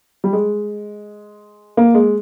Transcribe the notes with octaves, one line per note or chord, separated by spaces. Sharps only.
G3
G#3
A#3
G#3